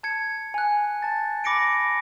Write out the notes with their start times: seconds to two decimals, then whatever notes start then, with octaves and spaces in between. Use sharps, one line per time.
0.03 A5 G#6 C#7
0.54 G#5 F#6
1.02 A5 A6
1.44 B5 D6 A#6 C#7 D7